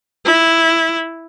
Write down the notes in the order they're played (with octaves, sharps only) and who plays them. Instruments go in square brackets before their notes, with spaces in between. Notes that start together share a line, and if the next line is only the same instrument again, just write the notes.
[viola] E4